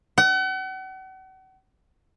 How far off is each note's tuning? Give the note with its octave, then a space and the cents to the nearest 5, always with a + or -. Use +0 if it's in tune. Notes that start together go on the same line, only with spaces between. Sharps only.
F#5 +40